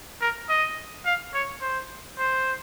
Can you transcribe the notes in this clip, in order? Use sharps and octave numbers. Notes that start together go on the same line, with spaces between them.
A#4
D#5
F5
C#5
C5
C5